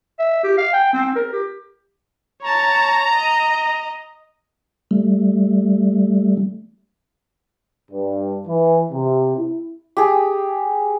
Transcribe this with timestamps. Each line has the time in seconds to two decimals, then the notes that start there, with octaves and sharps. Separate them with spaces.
0.19 E5
0.44 G4
0.58 F5
0.73 G5
0.93 C4
1.16 A#4
1.33 G4
2.43 C#5 A5 A#5
3.14 D#5
4.91 G3 A3
7.91 G2
8.47 E3
8.92 C3
9.36 E4
9.97 G4 G#4